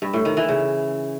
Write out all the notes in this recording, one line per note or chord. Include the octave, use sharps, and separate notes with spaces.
G2
A2
D#3
E3
C#3